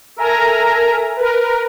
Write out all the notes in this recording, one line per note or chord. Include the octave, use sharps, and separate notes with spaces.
A4 A#4 E5 G#5 A#5
A#4 B4